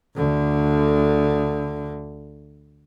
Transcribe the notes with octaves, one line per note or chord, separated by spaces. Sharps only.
D2 D3